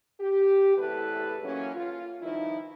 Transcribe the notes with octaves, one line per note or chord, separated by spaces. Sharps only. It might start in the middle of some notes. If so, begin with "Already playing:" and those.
G4
E2 A2 C3 A4 B4
E3 F#3 A#3 C#4
F4
G2 D#3 F3 D#4 E4